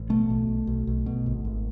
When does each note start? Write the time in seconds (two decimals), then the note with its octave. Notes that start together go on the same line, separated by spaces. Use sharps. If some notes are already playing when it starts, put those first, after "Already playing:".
Already playing: A1
0.10 B2 A3
0.30 B1
0.48 B1
0.67 B1
0.87 B1
1.06 B2
1.26 G#1
1.45 G#1